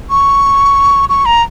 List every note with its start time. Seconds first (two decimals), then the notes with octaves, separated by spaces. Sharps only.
0.10 C#6
1.09 C#6
1.26 A#5